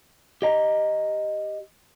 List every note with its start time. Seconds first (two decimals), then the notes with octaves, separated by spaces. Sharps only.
0.42 G4 D#5 A#5